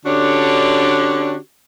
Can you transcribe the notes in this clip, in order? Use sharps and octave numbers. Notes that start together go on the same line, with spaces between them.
D3 C#4 D4 F#4 G4